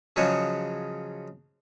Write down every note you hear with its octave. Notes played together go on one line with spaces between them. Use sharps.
C#3 F3 F#3 G#3 C#4